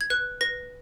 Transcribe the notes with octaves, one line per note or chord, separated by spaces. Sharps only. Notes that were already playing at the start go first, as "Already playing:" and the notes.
G#6
B4 F#6
B4 A#6